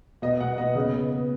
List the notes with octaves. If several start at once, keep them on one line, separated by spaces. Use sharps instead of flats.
B2 D#5
B2 F#5
B3 D#5
C#3 D#5
B3
B3